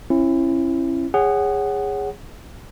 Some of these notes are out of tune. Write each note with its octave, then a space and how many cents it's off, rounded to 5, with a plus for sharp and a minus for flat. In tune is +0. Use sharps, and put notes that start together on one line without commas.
C#4 -40 E4 +20
G#4 -20 C#5 +0 F#5 +15